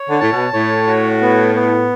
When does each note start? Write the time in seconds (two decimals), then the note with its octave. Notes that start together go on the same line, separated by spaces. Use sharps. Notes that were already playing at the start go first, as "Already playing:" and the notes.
Already playing: C#5
0.10 D3
0.20 A2 A5
0.32 B2
0.53 A2 C#5
0.87 F#4
1.21 B3
1.55 B3